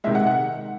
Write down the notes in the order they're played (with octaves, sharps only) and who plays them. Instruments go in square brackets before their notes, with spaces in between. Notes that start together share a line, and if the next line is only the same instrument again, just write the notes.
[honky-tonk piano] C3 D#3 G#3 E5
F#5
F#5